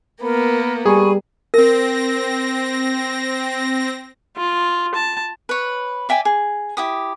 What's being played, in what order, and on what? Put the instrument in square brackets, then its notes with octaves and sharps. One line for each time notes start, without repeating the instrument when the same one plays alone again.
[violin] A#3 B3 [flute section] A#4 B5
[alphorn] G3 [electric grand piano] G#4 [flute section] G#5 B5 C#6
[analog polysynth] C4 A#6 [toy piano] A#4
[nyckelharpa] F4
A5
[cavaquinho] B4 C#5
D5 E5 G5 G#5
G#4
E4 G4 D#6